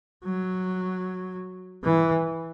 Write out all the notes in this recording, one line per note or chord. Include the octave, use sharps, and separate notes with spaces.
F#3
E3